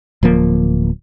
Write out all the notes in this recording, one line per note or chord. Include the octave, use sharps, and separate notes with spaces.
D1 F3 A#3